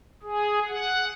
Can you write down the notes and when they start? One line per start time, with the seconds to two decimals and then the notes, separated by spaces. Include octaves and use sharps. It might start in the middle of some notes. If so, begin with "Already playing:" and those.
0.23 G#4
0.68 F#5